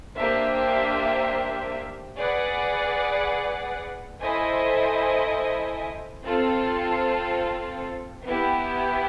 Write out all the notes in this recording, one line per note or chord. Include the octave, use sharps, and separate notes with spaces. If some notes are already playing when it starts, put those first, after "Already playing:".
A#3 D4 G4 C5 E5
G#4 B4 D5 F#5
E4 A4 C5 D#5 G#5
C4 F4 A4
B3 E4 G4